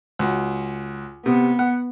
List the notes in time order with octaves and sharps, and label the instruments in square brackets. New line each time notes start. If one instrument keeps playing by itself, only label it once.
[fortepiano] C#2 F#4
[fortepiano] C3 [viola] B3
[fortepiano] F#5